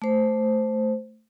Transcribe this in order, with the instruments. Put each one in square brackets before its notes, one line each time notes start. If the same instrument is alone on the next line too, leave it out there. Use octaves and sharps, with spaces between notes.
[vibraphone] A3 C5